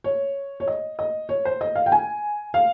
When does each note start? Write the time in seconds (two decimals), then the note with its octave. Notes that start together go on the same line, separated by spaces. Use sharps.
0.04 C#5
0.60 C#5
0.68 D#5
0.99 D#5
1.29 C#5
1.45 C5
1.61 D#5
1.75 F5
1.86 G5
1.92 G#5
2.54 F5